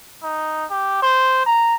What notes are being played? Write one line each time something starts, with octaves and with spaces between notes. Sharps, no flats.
D#4
G4
C5
A#5